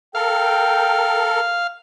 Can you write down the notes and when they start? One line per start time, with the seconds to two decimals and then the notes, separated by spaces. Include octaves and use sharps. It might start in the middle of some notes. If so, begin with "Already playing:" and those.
0.15 A4 A#4 F5 G5